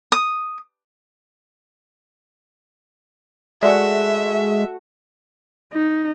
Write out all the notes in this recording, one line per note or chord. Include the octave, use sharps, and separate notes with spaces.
D#6
G#3 A3 F#4 D5 E5 F#5
D#4